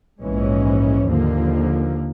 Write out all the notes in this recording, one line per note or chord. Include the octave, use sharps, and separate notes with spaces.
A#1 G#2 E3 G#3 C#4
D#2 D3 F3 A#3